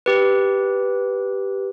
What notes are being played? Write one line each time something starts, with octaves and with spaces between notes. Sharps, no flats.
G4 B4